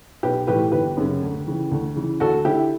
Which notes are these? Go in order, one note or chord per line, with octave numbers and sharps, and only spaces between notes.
B1 G4 B4
A2 E3 G4 B4
G1 G4 B4
F#2 C#3
D2
C#3 E3
D2
C#3 E3
D2 F#4 A4
D3 E4 G4